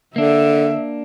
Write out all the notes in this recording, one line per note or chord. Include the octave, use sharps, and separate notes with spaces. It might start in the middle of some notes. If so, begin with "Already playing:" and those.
D3 A#3 D4 E5